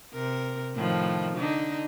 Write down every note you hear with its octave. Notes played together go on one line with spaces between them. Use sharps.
C3 A#4
A2 D#3 F3
D3 D4 D#4